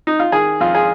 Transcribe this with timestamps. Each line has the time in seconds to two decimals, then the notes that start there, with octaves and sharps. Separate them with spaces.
0.07 D#4
0.20 F4
0.32 D#3 G#4
0.61 F2 F4
0.75 G#4